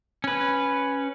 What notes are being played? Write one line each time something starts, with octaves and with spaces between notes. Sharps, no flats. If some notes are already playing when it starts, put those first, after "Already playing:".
C#4 B4